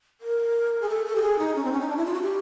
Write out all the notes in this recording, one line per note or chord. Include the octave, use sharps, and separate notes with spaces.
A#4
G#4
A4
A4
G4
G#4
D#4
C#4
C4
C#4
D#4
D4
E4
F4
F#4
G4